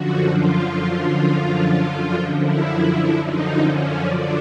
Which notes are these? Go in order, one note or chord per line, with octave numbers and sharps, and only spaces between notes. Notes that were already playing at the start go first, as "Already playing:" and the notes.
Already playing: F#2 D3 F3 F#4
F4
E4
F#2 D3 F3 D#4
C#4
D4